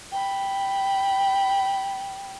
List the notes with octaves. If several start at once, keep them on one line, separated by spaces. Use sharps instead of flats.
G5 B5